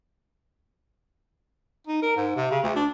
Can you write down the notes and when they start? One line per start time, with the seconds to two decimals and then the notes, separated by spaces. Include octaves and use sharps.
1.87 D#4
2.02 A#4
2.16 G#2
2.36 C3
2.51 C#3
2.63 D2
2.76 D4